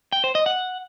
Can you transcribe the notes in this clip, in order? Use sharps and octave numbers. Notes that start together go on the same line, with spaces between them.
G5
C5
D#5
F#5